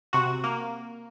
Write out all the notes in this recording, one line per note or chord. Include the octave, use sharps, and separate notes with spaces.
C3 F#4
A#3